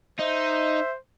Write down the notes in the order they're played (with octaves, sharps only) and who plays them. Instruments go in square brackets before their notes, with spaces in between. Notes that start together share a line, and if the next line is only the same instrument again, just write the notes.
[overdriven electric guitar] D#4 [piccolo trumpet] C5 [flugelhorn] E5